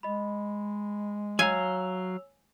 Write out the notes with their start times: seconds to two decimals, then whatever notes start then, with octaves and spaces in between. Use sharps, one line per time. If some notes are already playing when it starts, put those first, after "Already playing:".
0.03 G#3 D#5 B5
1.39 F#3 C#5 F5 G#5 A#5 E6 F7